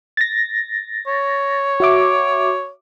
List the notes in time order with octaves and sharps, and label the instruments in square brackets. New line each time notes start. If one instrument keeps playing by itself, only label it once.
[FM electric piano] A6 A#6
[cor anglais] C#5
[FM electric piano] F#4 E5 D6